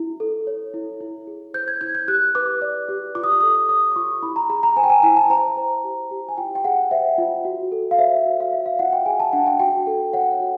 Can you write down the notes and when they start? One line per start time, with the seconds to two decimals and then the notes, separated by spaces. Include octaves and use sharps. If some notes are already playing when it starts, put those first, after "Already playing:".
Already playing: E4
0.20 A4
0.47 C#5
0.74 E4
1.00 E4
1.27 G#4
1.54 C5 G6
1.68 G#6
1.81 E4 G#6
1.95 G6
2.08 G4 F#6
2.35 B4 D6
2.62 D5
2.89 G4
3.15 F4 D6
3.24 D#6
3.32 D6
3.40 A4 D#6
3.49 D6
3.69 C#5 D#6
3.92 D6
3.96 F4 C#6
4.23 E4 B5
4.36 A#5
4.49 G#4 A#5
4.63 A#5
4.77 C5 G#5
4.83 G5
4.90 G#5
5.03 E4 G#5
5.17 A5
5.30 C5 A#5
5.57 C5
5.84 G4
6.11 G4
6.29 G#5
6.38 F4 G5
6.55 G5
6.64 G#4 F#5
6.91 C5 E5
7.18 F4
7.45 F#4
7.72 A4
7.91 F5
7.99 C5 E5
8.26 F#4
8.40 F5
8.53 C#5 E5
8.66 F5
8.79 F4 F#5
8.93 G5
9.06 G#4 G#5
9.20 A5
9.33 D4 F#5
9.47 G5
9.59 F#4 G5
9.87 A4
10.13 C#5 F#5
10.40 F#4